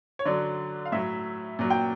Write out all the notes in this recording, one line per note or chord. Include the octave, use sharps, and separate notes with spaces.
C#5
D3 F#3 D5
F5
A2 F#3 E5
A#2 F#3
G5